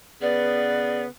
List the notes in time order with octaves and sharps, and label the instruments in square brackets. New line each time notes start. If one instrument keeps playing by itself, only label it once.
[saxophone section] C#3 B3 [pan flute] D5